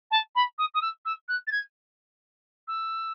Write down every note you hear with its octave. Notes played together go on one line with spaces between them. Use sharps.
A5
B5
D#6
D#6
E6
E6
F#6
A6
G#6
E6